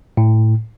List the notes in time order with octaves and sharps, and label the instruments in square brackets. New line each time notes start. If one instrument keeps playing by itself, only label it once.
[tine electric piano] A2